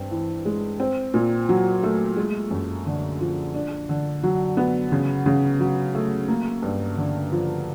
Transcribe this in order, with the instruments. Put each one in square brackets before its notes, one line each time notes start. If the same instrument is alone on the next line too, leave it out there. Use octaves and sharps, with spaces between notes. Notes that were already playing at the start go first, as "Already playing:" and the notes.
Already playing: [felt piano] G2 C4
E3
G#3
C4
A#2
F#3
A3
G#3
F#2
D3
F3
D4
D3
F#3
B3
C#3
C#3
F#3
A3
A#3
G2
D3
F3